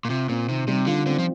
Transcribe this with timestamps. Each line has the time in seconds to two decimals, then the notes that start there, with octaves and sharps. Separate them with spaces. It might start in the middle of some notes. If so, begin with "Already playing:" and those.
0.05 A#2
0.09 C3 F4
0.29 A#2 C4
0.49 C3 D#3
0.67 C3 G3
0.86 D3 F4
1.06 D3 C4
1.19 F3